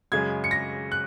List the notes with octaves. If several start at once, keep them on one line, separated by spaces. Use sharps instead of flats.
F#2 C#3 G#3 G#6
C#7
A#6
F#6